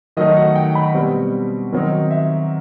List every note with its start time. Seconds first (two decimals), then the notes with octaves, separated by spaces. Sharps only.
0.17 D#3 F#3 A3 D#4 D#5
0.36 F#5
0.56 G5
0.75 B5
0.94 B2 G3 C4
1.72 D#3 F#3 C4 D#4
2.11 E5